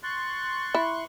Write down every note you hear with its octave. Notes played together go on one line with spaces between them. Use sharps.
C6 C#6 F#6 A6
E4